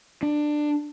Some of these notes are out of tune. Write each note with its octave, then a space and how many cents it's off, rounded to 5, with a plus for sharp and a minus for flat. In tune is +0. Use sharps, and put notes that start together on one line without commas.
D4 +15